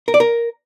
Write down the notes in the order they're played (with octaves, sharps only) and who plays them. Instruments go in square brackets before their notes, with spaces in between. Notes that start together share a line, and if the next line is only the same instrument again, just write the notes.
[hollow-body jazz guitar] A#4
D5
A#4